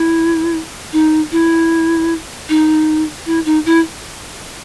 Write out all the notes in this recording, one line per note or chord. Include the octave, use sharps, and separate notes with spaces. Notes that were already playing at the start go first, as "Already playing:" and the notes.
Already playing: E4
D#4
E4
D#4
E4
D#4
E4